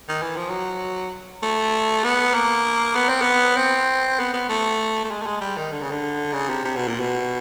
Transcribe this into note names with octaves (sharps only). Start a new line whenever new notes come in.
D#3
E3
F3
F#3
A3
B3
A#3
B3
C4
B3
C4
B3
B3
A3
A3
G#3
A3
G#3
G3
D#3
D3
C#3
D3
C#3
C3
C3
B2
A#2
B2